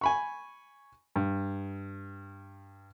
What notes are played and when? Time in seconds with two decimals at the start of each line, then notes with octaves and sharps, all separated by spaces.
0.01 G#5 B5 C#6
1.16 G2